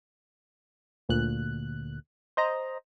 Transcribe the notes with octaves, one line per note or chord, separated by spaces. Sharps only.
D2 A#2 F#6
C5 D#5 A#5